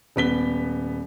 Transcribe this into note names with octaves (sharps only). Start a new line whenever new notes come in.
D#1 B3 B6 G7